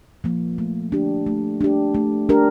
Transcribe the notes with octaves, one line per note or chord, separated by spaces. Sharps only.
F3 A#3
A3
D4 G4
A3
D4 G4
A3
D4 G4 A#4